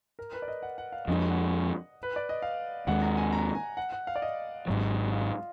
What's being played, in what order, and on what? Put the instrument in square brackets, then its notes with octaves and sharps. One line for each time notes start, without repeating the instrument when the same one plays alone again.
[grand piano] A#4
B4
D5
D#5
F#5
F#5
F5
[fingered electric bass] F2 F3 A#3 D4 [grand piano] D#5
[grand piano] F#5
B4
D5
D#5
F5
[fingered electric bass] D#2 D#3 G#3 [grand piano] F#5
[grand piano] A#5
G#5
A#5
G#5
F#5
F#5
F5
D5
D#5
[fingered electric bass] G#1 G#2 F#3
[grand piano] F4
F4